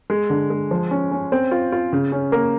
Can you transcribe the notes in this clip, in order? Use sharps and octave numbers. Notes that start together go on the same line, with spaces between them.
G#3
D3
G#3
F3
C#4
C#4
C4
F4
F4
C#3
C#4
A#3